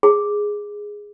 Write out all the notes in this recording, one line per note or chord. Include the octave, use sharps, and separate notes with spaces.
G#4